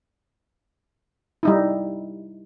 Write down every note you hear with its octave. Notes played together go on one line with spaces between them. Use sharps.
G3 D#4 E4